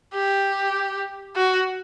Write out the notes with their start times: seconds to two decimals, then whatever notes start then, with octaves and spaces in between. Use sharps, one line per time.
0.14 G4
1.36 F#4